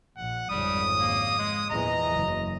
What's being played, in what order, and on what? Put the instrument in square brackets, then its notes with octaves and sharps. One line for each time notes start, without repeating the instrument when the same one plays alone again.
[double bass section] A#1 [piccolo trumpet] F#5
[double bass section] G#1 F2 C#3 [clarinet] G3 [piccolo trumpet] D#6
[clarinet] A#3
G#3
[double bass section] A#1 E2 E3 [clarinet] D#5 [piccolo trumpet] A#5
[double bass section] F#1